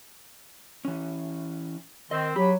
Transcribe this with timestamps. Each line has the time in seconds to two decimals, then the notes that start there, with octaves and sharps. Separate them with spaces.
0.85 E3 C#4
2.11 D#3 C4 D#5
2.36 F#3 G4 B5